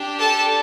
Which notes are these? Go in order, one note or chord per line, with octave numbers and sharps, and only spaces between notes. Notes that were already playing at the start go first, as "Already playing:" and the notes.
Already playing: D4 G4
A4 A5